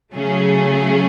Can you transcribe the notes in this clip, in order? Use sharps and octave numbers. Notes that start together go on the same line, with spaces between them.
C#3 F#3 A3 C#4 G#4